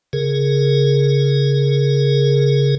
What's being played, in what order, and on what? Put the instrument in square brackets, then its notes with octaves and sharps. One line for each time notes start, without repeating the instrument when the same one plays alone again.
[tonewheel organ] C#3 G#4 A#4